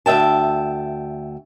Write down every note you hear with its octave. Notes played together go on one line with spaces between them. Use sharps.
D2 E5 G5 A5